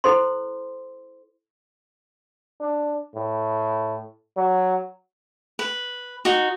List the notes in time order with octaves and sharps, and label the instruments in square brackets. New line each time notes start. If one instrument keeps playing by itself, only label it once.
[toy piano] E4 A4 C5 C6
[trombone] D4
A2
F#3
[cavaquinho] B4
D#4 F#4